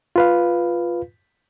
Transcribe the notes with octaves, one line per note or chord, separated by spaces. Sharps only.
F4 B4 F5